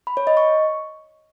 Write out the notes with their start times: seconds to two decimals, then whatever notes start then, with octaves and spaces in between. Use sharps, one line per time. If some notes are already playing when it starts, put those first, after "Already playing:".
0.07 B5
0.17 C#5
0.27 D#5
0.37 C#6